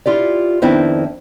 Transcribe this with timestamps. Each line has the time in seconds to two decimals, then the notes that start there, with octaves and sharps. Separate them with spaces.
0.06 E4 F4 G4 D5
0.62 F2 D#3 B3 C4 D4 E4